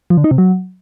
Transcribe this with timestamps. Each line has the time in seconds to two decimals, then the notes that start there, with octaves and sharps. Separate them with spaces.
0.10 F3
0.17 D3
0.24 D#4
0.31 C3
0.38 F#3